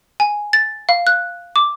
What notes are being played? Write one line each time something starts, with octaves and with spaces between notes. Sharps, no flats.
G#5
A6
F5
F#6
D6